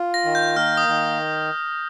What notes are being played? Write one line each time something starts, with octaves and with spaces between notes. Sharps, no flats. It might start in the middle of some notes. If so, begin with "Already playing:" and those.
Already playing: F4
A#6
D#3
G6
A#3 F6
D#6
D#3